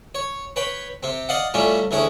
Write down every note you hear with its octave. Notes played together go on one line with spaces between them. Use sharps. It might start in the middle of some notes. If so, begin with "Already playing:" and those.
C#5
B4 C#5 G5
C3 C4
D5 D#5 F5 F#5
A2 G3 C#4 D4 F4
D2 E3 C#4 G#4 C#6